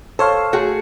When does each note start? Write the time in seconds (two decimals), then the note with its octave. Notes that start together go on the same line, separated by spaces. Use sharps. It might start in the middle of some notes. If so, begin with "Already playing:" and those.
0.19 A4 C5 C#5 F5
0.53 A3 F#4 G#4